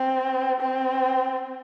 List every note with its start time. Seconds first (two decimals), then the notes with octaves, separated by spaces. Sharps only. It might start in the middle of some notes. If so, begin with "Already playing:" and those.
Already playing: C4
0.61 C4